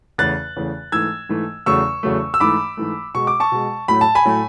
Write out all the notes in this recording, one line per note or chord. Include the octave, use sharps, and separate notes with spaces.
E2 C#3 E3 A3 F#6 A6
E2 C#3 E3 A3
G#2 E3 A3 E6 G#6
G#2 E3 A3
E2 C#3 F#3 A3 C#6 E6
E2 C#3 F#3 A3
E6
G#2 E3 A3 B5 D6
G#2 E3 A3
B2 G#3 C#6
D6
A5 C#6
B2 G#3
A2 F#3 A3 B5
A5
G#5 B5
A2 F#3 A3